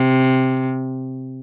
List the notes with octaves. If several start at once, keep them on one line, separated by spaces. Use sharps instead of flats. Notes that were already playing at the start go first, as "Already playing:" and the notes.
Already playing: C3